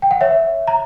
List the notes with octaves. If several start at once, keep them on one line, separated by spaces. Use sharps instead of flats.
G5
F#5
C#5 E5
A#5